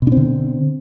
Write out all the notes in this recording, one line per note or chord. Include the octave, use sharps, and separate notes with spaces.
B2 D3 C4 D4